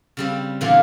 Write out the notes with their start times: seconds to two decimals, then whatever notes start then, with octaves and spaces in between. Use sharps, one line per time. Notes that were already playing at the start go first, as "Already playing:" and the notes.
0.17 C#3 G3 C4
0.61 A#2 D3 E3 A#3 B3 F4